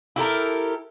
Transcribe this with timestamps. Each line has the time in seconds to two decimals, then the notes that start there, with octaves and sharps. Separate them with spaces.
0.16 E4 G4 A4 A#4